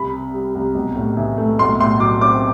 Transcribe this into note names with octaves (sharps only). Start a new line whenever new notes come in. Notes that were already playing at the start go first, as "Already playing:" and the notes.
Already playing: C2 B5
C3
G3
C2
B1
A2
E3
A3
B1 C6
A2 C6
F#3 D6
C4 D6